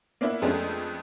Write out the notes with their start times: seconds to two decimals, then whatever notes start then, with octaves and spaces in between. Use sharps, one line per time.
0.21 A#3 B3 D4 E4
0.42 F2 G#3 A3 B3 C#4 D4